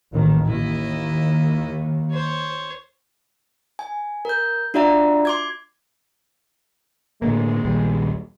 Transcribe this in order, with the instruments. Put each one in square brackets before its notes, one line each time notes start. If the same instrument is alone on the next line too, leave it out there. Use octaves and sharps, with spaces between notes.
[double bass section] A1 D#2 D#3
[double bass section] D#2 D#3 [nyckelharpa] E4 D#5
[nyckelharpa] C5 C#5
[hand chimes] G#5
A#4 G6
D4 F4 F#4 D5 E5 A#5
C6 D6 G#6
[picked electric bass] A2 D3 A#3 [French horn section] G#3
[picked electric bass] A#1 D#2 G3